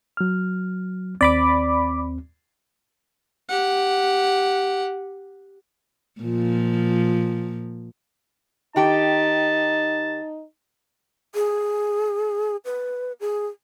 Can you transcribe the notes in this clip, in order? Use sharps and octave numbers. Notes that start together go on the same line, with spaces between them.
F#3 F6
D#2 C4 D5 B5 D6
G4 F#5
A#2 F3
D#3 D#4 G4 A5
G#4
B4
G#4